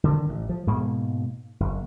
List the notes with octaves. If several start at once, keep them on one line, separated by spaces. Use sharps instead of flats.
D3 D#3
A1
F3
G#2 B2 G#3 A#3
F#1